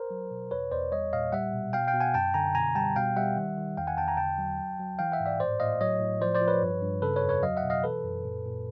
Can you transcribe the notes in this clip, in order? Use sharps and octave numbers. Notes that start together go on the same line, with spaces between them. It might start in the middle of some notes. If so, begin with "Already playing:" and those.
Already playing: A#4 C5
F#3
B2
E2 B4 C#5
E2 C5 D5
G3 C#5 D#5
A#2 D#5 F5
G3 E5 F#5
B2
B2 F5 G5
F5 G5
B2
F#5 G#5
F#2 G5 A5
D3 G#5 A#5
B2 G#5 A#5
G3 G5 A5
B2 F5 G5
G3 E5 F#5
D#3
D#3
E2 F5 G5
F#5 G#5
E2 G5 A5
G#5 A#5
D3 G5 A5
F#3
F#3
F#3
E3 F5 G5
E5 F#5
G#2
D5 E5
A2 C5 D5
A2 D#5 F5
F#3 C#5 D#5
A2
F3 C5 D5
C5 D5
F3
B4 C#5
G2
G2
C#3 A4 B4
B4 C#5
F2
B4 C#5
F#3 D#5 F5
E5 F#5
B2
D#5 F5
E3 A4 B4
F#2
A#2
A#2